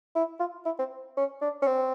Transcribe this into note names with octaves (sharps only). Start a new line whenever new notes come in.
E4
F4
E4
C4
C#4
D4
C#4
C4